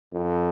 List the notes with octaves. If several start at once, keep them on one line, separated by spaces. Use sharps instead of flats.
F2